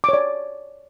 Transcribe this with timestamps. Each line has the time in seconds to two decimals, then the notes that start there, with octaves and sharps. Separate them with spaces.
0.04 D6
0.09 C#5
0.13 D5